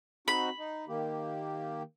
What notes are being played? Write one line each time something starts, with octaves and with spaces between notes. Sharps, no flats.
C4 D#4 F#4 B5
D#4
D#3 A#3 G4